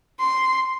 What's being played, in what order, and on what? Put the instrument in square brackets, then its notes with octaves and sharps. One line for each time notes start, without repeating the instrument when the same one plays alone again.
[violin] C6